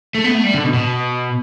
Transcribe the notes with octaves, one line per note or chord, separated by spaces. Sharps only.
A3
B3
A3
G3
D3
B2
B2